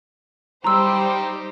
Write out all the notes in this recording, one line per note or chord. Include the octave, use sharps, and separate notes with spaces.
G3 D#4 G4 C5 A#5 C6 E6